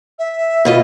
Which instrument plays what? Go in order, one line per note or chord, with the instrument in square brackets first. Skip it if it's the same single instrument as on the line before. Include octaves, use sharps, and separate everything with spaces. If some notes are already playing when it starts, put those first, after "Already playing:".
[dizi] E5
[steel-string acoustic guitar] B2 F4 D#5